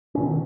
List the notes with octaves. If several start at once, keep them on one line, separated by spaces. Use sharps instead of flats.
B2 D#3 C#4